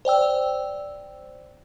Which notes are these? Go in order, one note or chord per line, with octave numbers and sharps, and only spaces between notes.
C5 D5 G5 E6